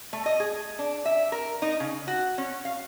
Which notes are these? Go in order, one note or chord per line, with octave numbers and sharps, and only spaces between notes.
A3
D#5
G#4
D4
E5
A#4
D#4
C#3
F#4
C#4
F5